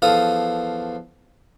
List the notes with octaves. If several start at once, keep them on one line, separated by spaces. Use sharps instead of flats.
E2 F3 A4 F5 D#6